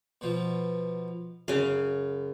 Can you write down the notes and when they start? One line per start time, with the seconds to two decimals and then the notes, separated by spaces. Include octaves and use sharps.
0.21 B2 F3
1.48 F#2 C#3 F5